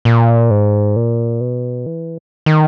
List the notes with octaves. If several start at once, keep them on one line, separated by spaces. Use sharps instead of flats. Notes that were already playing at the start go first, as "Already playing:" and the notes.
A#2
G#2
A#2
B2
E3
D#3